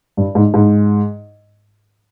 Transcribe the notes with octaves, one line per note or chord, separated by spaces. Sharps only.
G2
G#2
G#2